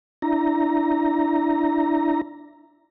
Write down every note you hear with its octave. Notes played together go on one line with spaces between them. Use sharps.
D4 E4 A#5